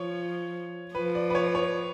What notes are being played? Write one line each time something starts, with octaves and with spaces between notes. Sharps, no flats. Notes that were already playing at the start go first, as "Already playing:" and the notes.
Already playing: F3 C#5
F3 B4
D5
B4
C#5
C#5